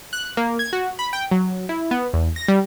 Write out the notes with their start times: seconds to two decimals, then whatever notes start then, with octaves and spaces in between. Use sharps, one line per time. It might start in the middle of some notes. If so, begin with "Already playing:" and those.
0.13 F#6
0.37 A#3
0.59 G#6
0.73 F#4
0.99 B5
1.13 G5
1.31 F#3
1.69 E4
1.91 B3
2.13 E2
2.36 A#6
2.48 G3